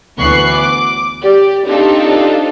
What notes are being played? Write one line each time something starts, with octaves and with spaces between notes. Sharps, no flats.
D2 E3 B3 C#6 F#6 C7
D6
G4 D5
C4 D4 D#4 F4 G4 A4